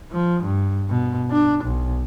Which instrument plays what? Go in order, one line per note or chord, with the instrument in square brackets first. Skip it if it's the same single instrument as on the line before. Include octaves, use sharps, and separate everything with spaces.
[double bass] F3
G2
B2
D4
B1